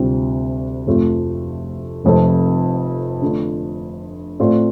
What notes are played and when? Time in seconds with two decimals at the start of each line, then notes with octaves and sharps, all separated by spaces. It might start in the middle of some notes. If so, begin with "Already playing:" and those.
Already playing: D2 C3 G3 C4 F4
0.87 F1 F2 C3 A3 F4
2.04 F1 F2 F3 C4 A4
3.22 D3 A3 D4 F4
4.40 A2 A3 C4 F4 D5